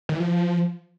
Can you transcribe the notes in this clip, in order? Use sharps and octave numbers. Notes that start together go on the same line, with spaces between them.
D#3
E3
F3